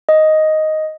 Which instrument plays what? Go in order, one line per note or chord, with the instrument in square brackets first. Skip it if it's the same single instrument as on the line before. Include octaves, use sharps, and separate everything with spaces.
[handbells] D#5